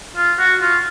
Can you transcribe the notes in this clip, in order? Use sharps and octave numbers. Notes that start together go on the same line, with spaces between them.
F4
F#4
F4